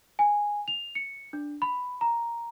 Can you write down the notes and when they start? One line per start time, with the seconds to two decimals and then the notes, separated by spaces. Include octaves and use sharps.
0.19 G#5
0.68 F7
0.95 C#7
1.33 D4
1.62 B5
2.01 A#5